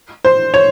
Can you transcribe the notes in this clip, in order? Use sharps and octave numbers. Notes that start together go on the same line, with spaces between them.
C5
C#5